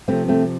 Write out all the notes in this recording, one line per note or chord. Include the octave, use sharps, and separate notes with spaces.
C3 F3 A3 C4
A3 C4